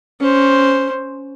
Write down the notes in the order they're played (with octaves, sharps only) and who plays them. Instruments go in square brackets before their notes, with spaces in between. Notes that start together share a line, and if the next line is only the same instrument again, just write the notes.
[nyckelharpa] C#4 C5